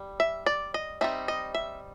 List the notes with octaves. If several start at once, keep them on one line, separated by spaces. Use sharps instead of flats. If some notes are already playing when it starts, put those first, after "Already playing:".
Already playing: G3
E5
D5
D#5
G3 C4 D#4 E5
D#5
E5